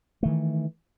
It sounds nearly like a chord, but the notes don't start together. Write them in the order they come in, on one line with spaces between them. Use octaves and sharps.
A3 D#3 E3